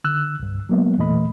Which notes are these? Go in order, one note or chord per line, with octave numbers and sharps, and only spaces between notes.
D3 E6 F#6
C2 G2
F#3 G#3 A#3 B3
E2 A#2 E3 A3 D#5 B5